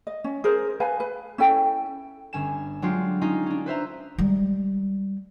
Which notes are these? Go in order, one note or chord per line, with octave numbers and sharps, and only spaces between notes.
D#5
C#4
G#4 A#4 C5
B4 F5 G#5 A5
B4
C#4 E4 A4 G5
G1 C#4 G#5 E7
F#3 G#3 D4 F4 G4
C#4 D#4 F4
C#4 D4
B4 C5 E5 A#5
G3 G#3